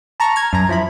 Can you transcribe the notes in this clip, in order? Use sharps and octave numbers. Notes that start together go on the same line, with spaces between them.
A5 A#5 C#6 F6
F6 G#6
F#2 A#5
F3 E4 B5